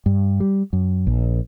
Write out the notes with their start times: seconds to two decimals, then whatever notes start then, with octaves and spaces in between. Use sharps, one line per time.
0.06 G2
0.40 G3
0.73 F#2
1.07 A#1